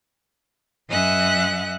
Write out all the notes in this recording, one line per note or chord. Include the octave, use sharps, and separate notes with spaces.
F#2 D#5 E5 F#5 G#5 F#6